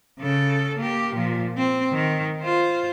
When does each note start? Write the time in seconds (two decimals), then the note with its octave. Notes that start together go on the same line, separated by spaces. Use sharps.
0.19 C#3 A4
0.78 A#3 G4
1.15 A#2 F3
1.57 C4
1.92 D#3
2.42 F4 C5